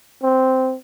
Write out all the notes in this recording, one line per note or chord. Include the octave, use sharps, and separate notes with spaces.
C4